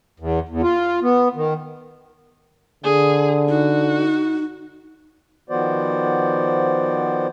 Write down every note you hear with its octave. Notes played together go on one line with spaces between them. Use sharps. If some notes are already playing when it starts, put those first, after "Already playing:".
E2
E2
F4
B3
D#3
D3 G#4
D#4 F#4
D#3 F3 B3 F#4 C5 D5